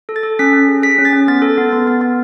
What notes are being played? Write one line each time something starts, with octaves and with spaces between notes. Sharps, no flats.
A4
A6
A4
C#4 B6
C#4
G#4
G#4 B6
C#4
A6
C#4
B3 A6
A4
B3
B3
B3
B3